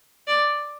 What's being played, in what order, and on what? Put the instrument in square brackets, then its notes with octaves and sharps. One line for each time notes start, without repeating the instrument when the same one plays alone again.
[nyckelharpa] D5